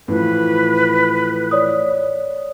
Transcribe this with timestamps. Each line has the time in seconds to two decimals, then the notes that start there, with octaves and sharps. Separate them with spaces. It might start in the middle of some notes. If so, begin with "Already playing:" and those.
0.08 A2 E3 F3 B4
1.51 C#5 D5 D#6